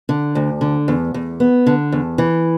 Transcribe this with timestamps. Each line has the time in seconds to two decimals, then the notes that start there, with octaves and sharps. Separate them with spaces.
0.09 D3
0.35 D2
0.61 D3
0.88 E2
1.14 E2
1.40 B3
1.66 D3
1.92 E2
2.18 E3